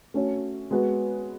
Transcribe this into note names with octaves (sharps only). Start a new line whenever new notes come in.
A3 C#4 F#4 C#5
G#3 B3 F#4 B4